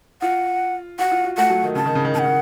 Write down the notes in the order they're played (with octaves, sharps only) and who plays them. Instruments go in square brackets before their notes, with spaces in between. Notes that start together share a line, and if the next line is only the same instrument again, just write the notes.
[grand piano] F4 [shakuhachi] F#5
[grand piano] F#4 [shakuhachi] F#5
[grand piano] F4
F#4
[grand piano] A3 [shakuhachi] F#5
[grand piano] F#3
D#3
[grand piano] C#3 [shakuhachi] A5
[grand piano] D#3
C#3
D#3
[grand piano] C#3 [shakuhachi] F#5 A5
[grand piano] D#3